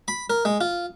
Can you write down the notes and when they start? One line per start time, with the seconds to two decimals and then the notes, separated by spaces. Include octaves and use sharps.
0.08 B5
0.30 A#4
0.45 G#3
0.61 F4